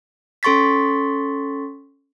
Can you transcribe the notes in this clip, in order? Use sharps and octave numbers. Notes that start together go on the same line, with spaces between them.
C#4 A4 C6 C#6 A6 B6